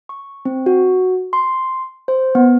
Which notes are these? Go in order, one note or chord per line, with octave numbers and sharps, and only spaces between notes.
C#6
C4
F#4
C6
C5
B3